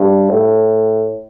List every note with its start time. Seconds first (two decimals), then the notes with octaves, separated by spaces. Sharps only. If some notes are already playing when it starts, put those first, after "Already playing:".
Already playing: G2
0.29 A2